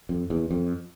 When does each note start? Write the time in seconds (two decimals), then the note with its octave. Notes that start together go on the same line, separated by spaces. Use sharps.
0.09 F2
0.30 E2
0.51 F2